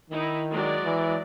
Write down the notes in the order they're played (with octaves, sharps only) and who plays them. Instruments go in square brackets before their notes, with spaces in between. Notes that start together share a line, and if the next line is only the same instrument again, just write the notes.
[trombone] D#3 [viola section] D#4 E4
[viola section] F#3 G#3 D5
[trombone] E3